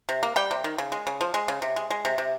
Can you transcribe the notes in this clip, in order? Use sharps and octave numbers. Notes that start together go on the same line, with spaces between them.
C3
A#3
G3 G5
C3
D#3
C#3
G#3
C#3
F3
G#3
C#3
C3
G#3
G#3
C3
C3